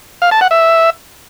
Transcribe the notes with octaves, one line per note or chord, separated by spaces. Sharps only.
F5
A5
F#5
E5